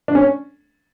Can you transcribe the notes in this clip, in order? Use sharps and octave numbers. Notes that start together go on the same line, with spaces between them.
D4
C#4